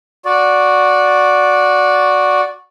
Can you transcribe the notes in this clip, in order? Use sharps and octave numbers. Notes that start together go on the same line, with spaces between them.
F#4 D5